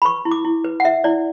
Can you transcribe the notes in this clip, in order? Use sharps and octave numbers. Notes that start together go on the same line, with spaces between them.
B5
B4 C#6
E4
D6
E4
B4
F#5
B4 E5
E4 D5